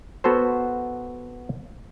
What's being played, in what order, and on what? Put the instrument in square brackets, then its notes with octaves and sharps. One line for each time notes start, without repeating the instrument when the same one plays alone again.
[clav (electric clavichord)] B3 F#4 A4 C5